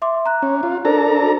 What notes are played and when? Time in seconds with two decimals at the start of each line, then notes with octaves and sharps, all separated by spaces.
0.02 E5 C6 D6
0.26 A#5 F#6
0.42 C#4
0.63 F4
0.85 D4 A4 A#4 C5 D5 A#5
1.22 F#4